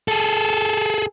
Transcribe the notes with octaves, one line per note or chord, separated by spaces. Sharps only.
G#4 A4